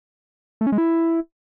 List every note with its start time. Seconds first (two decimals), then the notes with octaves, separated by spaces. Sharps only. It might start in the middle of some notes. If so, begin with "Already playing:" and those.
0.61 A3
0.67 C#4
0.72 G#3
0.78 E4